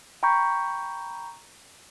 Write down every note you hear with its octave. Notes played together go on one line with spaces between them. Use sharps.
G5 A#5 B5 C#6 G6